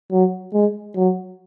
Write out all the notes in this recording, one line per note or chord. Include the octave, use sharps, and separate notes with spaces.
F#3
G#3
F#3